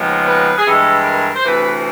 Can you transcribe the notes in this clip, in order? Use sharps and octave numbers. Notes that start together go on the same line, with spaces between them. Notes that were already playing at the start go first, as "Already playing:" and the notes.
Already playing: D#2 C#3 F3 G#3 B3
B4
G#4
G2 E3 G#3 A4
A#4
C5
D2 C3 E3 B4